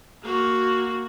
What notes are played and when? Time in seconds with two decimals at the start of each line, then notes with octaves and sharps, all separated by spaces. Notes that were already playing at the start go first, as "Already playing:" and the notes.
0.23 A#3 F#4